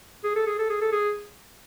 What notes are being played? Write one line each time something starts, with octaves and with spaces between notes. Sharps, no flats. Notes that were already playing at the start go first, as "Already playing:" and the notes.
G#4
A4
G#4
A4
G#4
A4
G#4